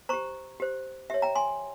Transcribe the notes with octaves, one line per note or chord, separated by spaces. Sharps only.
G4 C5 A#5 C#6
G4 C5
G4 C#5 E5
G5 A#5
G#5 C6